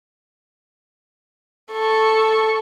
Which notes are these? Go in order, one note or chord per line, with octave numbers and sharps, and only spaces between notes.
A4 C#6